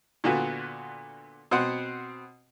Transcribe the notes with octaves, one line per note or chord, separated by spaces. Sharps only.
A#2 D3 B3 F4 F#4
B2 C4 C5 F#5